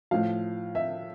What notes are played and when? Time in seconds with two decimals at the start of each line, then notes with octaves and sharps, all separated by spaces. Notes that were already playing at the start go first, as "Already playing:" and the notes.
0.11 A2 F3 F5
0.75 E5